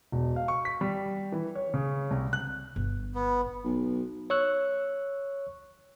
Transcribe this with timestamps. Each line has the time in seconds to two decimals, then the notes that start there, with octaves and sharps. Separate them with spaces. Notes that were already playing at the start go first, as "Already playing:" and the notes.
0.12 E1
0.36 F5
0.48 C#6
0.65 B6
0.81 G3
1.32 E3
1.55 C#5
1.74 C#3
2.11 C2
2.33 F#6
2.76 G1
3.15 B3
3.64 B1
4.30 C#5 C#6 E6 F#6